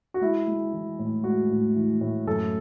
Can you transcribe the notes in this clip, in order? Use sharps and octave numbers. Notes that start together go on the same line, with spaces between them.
F#4
G#3 E4
G#3
E3
A2
G#3 F#4
A2
E3
A2
F#2 A4